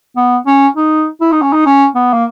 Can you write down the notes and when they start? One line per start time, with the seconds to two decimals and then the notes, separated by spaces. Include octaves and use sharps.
0.16 B3
0.46 C#4
0.77 D#4
1.21 E4
1.32 D#4
1.42 C#4
1.53 D#4
1.66 C#4
1.95 B3
2.13 A#3